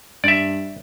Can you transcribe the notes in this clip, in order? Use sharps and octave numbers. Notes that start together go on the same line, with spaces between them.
G2 D5 E5